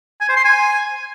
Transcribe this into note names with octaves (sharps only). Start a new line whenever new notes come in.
G#5
C5
C6
G#5